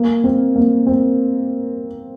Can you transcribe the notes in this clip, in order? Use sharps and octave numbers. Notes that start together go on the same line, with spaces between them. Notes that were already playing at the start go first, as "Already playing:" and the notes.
Already playing: A#3
C4
A#3
C4